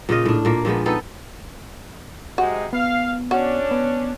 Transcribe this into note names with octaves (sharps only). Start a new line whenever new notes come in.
A#2 C#3 F4 D#5
A2 D4
A#2 A#3
A#2 F3 G#3 B3
B3 C4 D#4 A4
C3 G#3 D#4 F#4
B3 F5
C#4 D4 F#4
B3